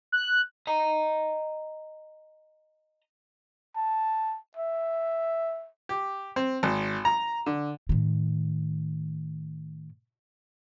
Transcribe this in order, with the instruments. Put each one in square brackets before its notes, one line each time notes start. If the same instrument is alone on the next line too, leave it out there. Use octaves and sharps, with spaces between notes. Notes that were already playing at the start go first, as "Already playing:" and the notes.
[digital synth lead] F#6
[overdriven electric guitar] D#5 A#5
[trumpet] A5
E5
[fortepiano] G4
C4
G#1
A#5
D3
[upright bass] A2 D#3